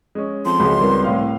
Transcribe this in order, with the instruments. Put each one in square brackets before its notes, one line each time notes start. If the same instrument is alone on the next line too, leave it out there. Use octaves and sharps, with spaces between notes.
[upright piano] G#3 C#4
[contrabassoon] F2 [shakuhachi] C6
[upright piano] C#2 F#3 B5 [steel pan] G#3
[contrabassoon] C2 [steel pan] G3 A#4 B4
[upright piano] A2 F5